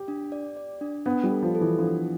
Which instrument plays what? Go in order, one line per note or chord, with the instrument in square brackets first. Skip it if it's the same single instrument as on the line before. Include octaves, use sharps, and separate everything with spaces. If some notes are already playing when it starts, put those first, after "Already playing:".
Already playing: [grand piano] G4
[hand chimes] D4
D5
D5
D4
[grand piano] B3 [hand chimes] D4
[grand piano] G3
[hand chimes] A4
[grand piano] F3
[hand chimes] A4
[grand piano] E3
[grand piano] F3 [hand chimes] D4